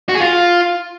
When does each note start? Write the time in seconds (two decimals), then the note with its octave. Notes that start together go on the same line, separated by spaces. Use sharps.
0.09 F#4
0.15 G#4
0.20 F4